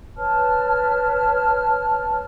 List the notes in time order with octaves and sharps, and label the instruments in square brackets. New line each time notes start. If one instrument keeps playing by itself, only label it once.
[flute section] B4 C#5 A5 F6